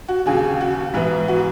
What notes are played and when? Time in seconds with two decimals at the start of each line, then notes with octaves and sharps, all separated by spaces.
0.08 F#4
0.26 D#2 C#3 F#3 G#4
0.61 F#4
0.94 G#2 E3 B3 E4
1.28 F#4